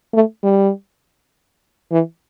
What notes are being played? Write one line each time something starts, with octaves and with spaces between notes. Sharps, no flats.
A3
G3
E3